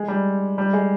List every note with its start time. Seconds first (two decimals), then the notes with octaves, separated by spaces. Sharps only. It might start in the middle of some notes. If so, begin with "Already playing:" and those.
Already playing: G#3
0.08 G3
0.58 G3
0.73 G#3